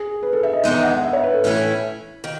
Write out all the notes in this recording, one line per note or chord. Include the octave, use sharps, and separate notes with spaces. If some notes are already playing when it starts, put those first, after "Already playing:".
Already playing: G#4
B4
A4
E5
D#5
E2 D#3 G#3 B3 D#4 E5
F#5
E5
C#5
B4
A4
A2 E3 A3 C#4 E4
D#3